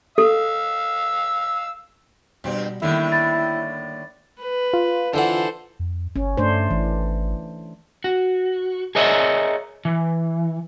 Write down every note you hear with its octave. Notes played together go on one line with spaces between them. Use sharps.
A4 F5 E6
G2 B2 G3 C4
A2 D3 D#3 G3 A#3 E4
B5 A6
B4
F4
D3 E3 A4 C5 F#5
F2
G1 C#4
G2 A3 D4 C5
G#1 E3
F#4
G#4 A#4 C#5 D#5 E5
E3